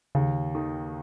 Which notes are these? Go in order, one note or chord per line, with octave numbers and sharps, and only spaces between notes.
D#2 C#3
D#3